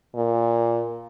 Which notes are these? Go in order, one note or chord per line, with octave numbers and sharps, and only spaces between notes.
A#2